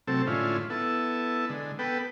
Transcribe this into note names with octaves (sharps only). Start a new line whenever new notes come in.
C3 F#3 A3 C4 A4
A2 D3 G#3 C#4 E4 F4
B3 E4 A4
D3 G#3
B3 A4 B4 G5